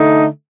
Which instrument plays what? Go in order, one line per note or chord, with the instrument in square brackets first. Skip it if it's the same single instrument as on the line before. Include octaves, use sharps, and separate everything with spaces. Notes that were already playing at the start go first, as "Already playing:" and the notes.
Already playing: [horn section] D3 A3 D#4